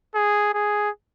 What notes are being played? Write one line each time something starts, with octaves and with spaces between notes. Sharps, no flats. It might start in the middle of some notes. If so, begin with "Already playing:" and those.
G#4
G#4